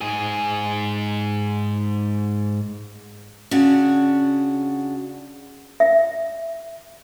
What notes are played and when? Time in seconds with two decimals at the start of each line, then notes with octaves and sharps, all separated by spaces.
0.01 G#2 G#4
3.51 C#3 D4 F#4
5.80 E5